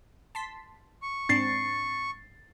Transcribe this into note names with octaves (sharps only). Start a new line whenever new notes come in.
A5 C6 B6
C#6
G#2 C4 D4 A6 C7